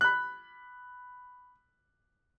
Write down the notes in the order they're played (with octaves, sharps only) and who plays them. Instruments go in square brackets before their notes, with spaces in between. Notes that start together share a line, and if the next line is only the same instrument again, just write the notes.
[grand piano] B5 F#6